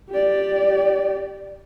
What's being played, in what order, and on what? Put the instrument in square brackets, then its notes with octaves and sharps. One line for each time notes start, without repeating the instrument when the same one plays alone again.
[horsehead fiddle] G4 D5